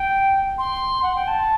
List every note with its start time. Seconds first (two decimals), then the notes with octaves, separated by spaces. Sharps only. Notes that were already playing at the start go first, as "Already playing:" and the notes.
Already playing: G5
0.58 C6
1.03 F#5
1.15 G5
1.27 A5